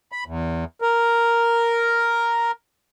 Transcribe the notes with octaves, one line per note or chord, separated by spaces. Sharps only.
B5
E2
A#4